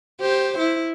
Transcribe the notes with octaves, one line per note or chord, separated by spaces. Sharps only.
G4 C5
E4